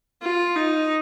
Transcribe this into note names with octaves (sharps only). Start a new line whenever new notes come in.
F4
D#4